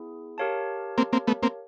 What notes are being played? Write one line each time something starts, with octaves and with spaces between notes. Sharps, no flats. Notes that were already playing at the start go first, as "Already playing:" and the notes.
Already playing: B3 E4 G#4
G4 A#4 C#5 F5 A5
A#3 C4
A#3 C4
A3 B3
A#3 C4